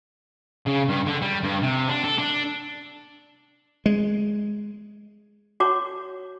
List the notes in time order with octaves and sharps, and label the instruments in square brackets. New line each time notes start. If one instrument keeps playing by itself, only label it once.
[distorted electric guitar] C#3
G2
D3
G3
G2
C3
D4
A4
D4
[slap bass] G#3
[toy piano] F#4 C#5 D6